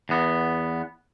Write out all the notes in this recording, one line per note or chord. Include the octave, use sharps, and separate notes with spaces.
E2 B3